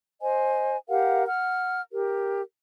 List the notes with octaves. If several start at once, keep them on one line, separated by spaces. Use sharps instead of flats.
C5 D#5 G#5
G4 A#4 F5 F#5
F#5 F6
G4 A#4